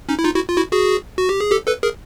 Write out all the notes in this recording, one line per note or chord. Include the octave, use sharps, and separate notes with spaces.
C#4 D#4
E4
D#4 F4
E4 F#4
F4
E4 F#4
F#4 G#4
F#4
G4
G#4
G4 A4
A4 B4
G#4 A#4